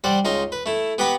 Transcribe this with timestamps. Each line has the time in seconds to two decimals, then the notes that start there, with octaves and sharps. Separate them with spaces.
0.04 G3 C5 D5 F#5
0.25 C#2 D#4 A#5 C6
0.52 B4
0.66 A3 E4
0.98 B3 G4 B4 F#5 A#5 B5